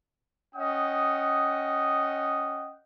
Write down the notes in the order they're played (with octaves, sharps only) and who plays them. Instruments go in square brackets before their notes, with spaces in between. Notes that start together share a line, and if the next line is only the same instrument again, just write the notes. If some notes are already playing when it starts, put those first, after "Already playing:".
[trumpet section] C#4 D#5 F#5 G5 D#6